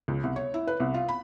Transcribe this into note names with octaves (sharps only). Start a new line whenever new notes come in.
C#2
C2
C#5
E4
B4
C2
F4
B5